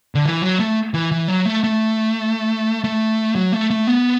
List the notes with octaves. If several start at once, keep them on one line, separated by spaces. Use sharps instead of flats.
D3
E3
F#3
A3
E3
E3
F#3
A3
A3
A3
F#3
A3
A3
B3